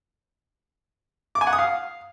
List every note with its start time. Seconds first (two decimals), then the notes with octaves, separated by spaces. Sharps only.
1.35 D6
1.41 G#5
1.47 F#5
1.53 D#6
1.59 F5